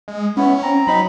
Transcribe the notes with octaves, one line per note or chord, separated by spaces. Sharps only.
G#3
B3 C#4 E4
C4 A#5
F#3 D#4 B5